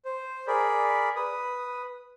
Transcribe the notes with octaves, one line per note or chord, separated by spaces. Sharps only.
C5
G#4 A#4 D5 B5
B4 D#6